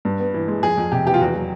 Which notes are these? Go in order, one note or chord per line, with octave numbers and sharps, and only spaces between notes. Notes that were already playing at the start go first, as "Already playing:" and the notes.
G2
B3
E3
G#3
F2 G#4
F2
C3 G4
E3 G4
F4
E2 F#4
F#3